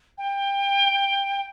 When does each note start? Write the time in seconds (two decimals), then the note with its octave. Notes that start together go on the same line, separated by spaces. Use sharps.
0.18 G5